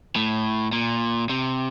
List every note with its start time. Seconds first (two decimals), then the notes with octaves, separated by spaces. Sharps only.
0.16 A2
0.72 A#2
1.30 C3